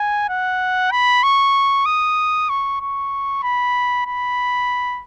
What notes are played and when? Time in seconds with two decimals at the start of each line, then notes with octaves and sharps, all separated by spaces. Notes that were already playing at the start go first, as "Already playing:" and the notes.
Already playing: G#5
0.29 F#5
0.91 B5
1.23 C#6
1.86 D#6
2.49 C#6
2.81 C#6
3.43 B5
4.06 B5